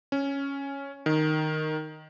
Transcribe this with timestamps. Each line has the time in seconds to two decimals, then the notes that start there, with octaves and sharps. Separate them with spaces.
0.12 C#4
1.06 D#3